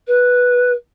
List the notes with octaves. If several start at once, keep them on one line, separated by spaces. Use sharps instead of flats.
B4